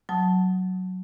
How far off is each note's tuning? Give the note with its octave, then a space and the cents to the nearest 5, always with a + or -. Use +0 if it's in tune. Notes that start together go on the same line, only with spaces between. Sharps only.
F#3 +0 A5 -5 D#6 +15